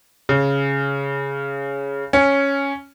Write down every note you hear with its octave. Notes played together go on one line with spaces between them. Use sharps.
C#3
C#4